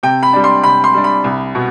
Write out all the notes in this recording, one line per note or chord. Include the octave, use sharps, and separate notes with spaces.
C3 G5
B5
G3 D4
C6
C3 B5
C6
G3 D4
B5
C2
B2 B3